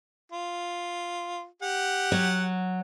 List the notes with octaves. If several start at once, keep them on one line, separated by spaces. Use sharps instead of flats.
F4
G4 F#5
F#3